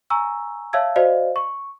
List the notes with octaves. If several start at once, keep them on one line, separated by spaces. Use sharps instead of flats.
G#5 A#5 C#6 E6
C#5 E5 F5 A5 E6 G#6
F#4 C5 D5 D#5 F5
C#6